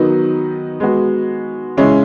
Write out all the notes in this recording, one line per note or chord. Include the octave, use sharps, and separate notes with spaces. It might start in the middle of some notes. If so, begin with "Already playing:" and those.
Already playing: D#3 F#3 B3 D#4
G#3 B3 F#4
C#3 G#3 C#4 E4